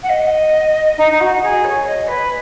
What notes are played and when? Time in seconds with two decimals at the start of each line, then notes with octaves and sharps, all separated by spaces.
0.03 F#5
0.09 D#5
0.97 D#4
1.11 D#4
1.20 F#4
1.42 G#4
1.64 C#5
1.86 D#5
2.07 B4